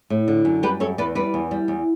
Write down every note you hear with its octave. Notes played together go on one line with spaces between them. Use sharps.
A2
D3
F#2
G3 G4 B4
F#2 A4 C#5
E2 B4 D5
G3 B4 D5
E2
G3
E2